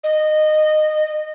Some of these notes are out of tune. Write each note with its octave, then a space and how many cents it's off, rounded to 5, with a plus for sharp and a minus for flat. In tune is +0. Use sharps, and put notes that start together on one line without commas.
D#5 -20